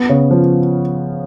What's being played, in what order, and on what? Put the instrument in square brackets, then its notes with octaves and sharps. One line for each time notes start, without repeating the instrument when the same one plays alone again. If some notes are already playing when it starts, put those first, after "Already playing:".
Already playing: [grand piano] B3
C#3
F3